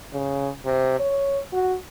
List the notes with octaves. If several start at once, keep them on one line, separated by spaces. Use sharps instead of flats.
C#3
C3
C#5
F#4